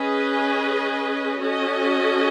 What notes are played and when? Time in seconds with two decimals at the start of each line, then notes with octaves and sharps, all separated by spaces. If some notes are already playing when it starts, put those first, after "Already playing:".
Already playing: C#4 G#4 B4 D#5
1.39 C#4 F#4 A4 D#5